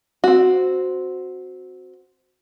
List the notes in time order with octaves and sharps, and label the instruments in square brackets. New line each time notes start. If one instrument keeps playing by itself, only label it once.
[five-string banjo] C4 F#4